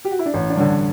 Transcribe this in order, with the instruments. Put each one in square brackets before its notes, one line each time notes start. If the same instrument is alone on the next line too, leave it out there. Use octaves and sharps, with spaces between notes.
[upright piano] G4
F#4
E4
D4
A1 C#4
D4
G2 D3 C#4